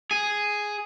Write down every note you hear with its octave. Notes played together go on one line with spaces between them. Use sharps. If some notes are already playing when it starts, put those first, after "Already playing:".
G#4